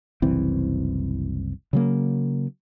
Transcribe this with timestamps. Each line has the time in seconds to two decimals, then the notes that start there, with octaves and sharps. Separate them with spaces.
0.22 F#1 C2 E3 C4
1.73 C#3 F#3 A#3